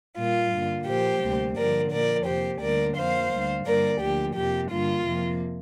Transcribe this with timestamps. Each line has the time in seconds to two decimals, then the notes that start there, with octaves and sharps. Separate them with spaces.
0.17 A#2 G3 A#3 F4
0.53 G2 D3 A#3
0.88 A#2 F3 A#3 G4 C5
1.22 D2 C3 G3 A#3
1.57 G2 D3 F3 A#3 A#4 D5
1.92 A#2 F3 A#3 A#4 D5
2.26 F2 C3 A#3 G4 C5
2.61 D2 D3 G3 A#3 A#4 D5
2.97 F2 F3 A#3 C5 F5
3.32 D2 D3 G3
3.66 G2 D3 G3 A#3 A#4 D5
4.01 D2 D3 F3 A#3 G4
4.36 F2 C3 A#3 G4
4.71 G2 D3 G3 A#3 F4
5.06 F2 C3 F3 A#3